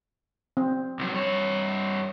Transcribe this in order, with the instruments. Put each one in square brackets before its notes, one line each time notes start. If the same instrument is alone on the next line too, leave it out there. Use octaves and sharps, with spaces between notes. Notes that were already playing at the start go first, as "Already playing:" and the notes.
[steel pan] C4
[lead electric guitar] C2 F#3
G2 C#5